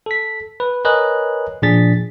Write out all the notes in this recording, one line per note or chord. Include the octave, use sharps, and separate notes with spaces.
A4 B6
B4
A#4 B4 C#5 D#5 G#5 F#6
A#2 F3 D4 G#4 A6 B6